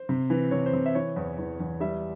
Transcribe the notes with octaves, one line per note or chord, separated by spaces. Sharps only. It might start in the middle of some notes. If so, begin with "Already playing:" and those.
Already playing: C5
C3
E3
C3 C#5
C5
C3
E5
E3 C#5
E2
E2
E2
G3 E5